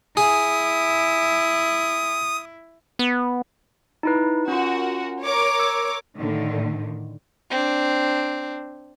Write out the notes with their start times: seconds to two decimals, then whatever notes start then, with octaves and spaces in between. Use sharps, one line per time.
0.17 E4 G#4 D#6
2.99 B3
4.03 D#4 E4 B4
4.48 C#4 F4 F#4 A#4
5.24 A#4 C#5 D6
5.60 E6
6.18 A2 D3 D#3
7.51 C4 D4